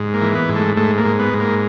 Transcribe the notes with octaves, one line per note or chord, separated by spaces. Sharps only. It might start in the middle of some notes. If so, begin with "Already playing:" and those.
Already playing: G#2
A#3
E3
B3
G#2
A3
G#2 A3
A#3
G#2
B3
G#2
A#3